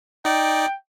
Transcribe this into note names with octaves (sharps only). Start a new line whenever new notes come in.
D#4 D5 G5